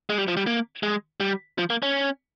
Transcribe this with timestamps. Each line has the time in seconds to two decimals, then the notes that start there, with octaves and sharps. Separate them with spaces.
0.10 G#3
0.18 G3
0.28 F3
0.37 G3
0.47 A#3
0.83 G#3
1.20 G3
1.58 F3
1.70 A#3
1.83 C#4